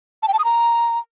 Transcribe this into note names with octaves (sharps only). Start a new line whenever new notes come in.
A5
G5
A5
D#6
A#5